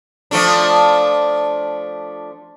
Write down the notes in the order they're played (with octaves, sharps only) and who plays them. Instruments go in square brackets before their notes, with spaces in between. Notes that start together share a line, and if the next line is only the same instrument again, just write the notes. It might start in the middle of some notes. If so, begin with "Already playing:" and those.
[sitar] F3 A3 D4